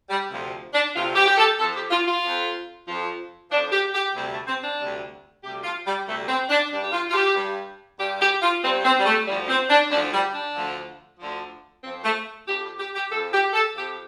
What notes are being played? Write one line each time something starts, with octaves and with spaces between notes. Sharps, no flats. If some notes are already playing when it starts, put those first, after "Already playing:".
G3
D2 C3 F3
D4
D2 C3 F3 F4
G4
G4
A4
F2 F3 A4
G4
F4
F4
F2 F3
F2 F3
F2 F3 D4
G4
G4
D2 C3 G3 C4
A3
C4
D4
D2 C3 G3
D2 C3 G3 G4
F4
G3
D2 C3 G3 A3
C4
D4
G2 G3 D4
G4
F4
F4
G4
G2 G3
G2 G3 G4
G4
F4
G2 G3 C4
C4
G3
A3
D2 D3 F3 G3
C4
D4
D2 D3 F3 D4
G3
D4
D2 D3 F3
D2 D3 F3
F2 F3 C4
A3
F2 F3 G4
G4
G4
G4
F2 F3 A4
G4
A4
F2 F3 G4